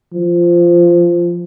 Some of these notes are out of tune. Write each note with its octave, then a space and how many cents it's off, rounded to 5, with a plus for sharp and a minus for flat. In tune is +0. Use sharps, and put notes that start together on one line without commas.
F3 -15